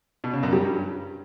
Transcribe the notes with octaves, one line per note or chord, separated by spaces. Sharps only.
B2
C#3
F#2
G3
G2